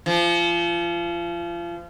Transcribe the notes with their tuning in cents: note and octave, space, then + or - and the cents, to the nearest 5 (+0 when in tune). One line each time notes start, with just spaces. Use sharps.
F3 -30